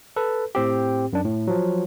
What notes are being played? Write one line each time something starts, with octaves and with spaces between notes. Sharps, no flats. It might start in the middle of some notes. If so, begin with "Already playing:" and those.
A4 B4
A2 C4 G4
F#2 D4
A2
F3 F#3